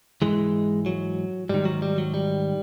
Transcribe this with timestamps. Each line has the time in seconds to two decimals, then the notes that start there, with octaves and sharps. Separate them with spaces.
0.22 G#2 E3 G#3
0.86 F#3
1.49 G#2 D#3 G3
1.65 F#3
1.82 G3
1.98 F#3
2.14 G3